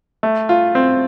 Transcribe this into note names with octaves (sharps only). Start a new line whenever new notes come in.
A3
F4
C4